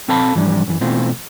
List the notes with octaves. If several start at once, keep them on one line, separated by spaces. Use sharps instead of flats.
B1 C4 A4 F5 A5 B5
G#2 E3 F3 G3 D4
F#2 E3
B2 E3 A3 C4 F4